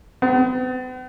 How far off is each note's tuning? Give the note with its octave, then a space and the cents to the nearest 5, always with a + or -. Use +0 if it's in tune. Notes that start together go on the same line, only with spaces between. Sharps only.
B3 +45